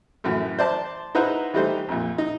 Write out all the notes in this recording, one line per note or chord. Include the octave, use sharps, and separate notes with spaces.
F#2 A2 E3 F#4
C5 D5 A5 C6
D#4 E4 B4 C5 F#5 A#5
E3 G3 A3 D#4 G4 C5
A#1 F2
D#4